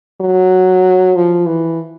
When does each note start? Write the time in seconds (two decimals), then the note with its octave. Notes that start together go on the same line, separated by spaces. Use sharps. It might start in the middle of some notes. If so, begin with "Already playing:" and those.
0.21 F#3
1.15 F3
1.46 E3